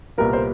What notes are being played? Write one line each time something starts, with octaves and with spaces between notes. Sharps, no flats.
C2 A#2 G3 B3 A#4
C5